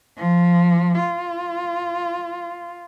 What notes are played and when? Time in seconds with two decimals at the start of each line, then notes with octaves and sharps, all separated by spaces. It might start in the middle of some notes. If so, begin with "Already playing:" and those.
0.18 F3
1.00 F4